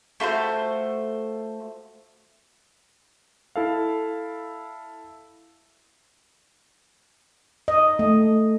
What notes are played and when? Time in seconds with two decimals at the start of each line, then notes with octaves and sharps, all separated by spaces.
0.20 A3 F4 F#4 C5
3.56 E4 A4 F5
7.68 D#5
7.99 A3